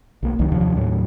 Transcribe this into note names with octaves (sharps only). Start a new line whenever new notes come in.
B1 A#3
G1 C2 D#3 F#3
D#2 C3 F3 D4
D#2 A2 F#3